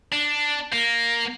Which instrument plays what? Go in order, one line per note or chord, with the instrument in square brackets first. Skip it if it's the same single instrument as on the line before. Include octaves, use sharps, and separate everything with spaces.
[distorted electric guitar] D4
A#3